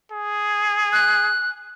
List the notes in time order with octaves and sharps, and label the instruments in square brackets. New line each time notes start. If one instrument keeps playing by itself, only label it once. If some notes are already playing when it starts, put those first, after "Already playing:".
[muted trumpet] G#4
[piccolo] F#6